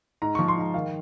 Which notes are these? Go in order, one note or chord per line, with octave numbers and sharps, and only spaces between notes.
G#2 A#5
F3 C#6
C6
G#2 A#5
D#3 F5